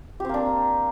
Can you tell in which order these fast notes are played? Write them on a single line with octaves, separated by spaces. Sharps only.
G4 C4 A#3 D4